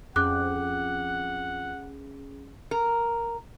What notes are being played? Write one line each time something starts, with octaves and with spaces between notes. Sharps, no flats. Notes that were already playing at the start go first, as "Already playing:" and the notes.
F2 C#4 G#4 F#5 D6 F#6
A#4